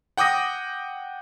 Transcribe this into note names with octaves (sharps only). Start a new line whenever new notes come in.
F#5 G5 D6 D#6 A#6